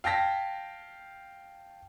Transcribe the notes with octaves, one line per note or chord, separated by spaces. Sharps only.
F5 G5 A5 A#6 B6